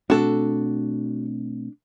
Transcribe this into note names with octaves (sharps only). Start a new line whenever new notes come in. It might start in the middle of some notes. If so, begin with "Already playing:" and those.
B2 A3 C4 D4 F#4 A4